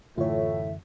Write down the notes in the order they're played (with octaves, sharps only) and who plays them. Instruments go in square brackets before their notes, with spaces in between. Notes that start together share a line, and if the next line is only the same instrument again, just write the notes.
[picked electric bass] F#2 D3 E3 [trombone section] A2 [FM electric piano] F4 C#5 [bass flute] E5